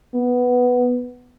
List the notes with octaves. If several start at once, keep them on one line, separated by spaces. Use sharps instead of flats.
B3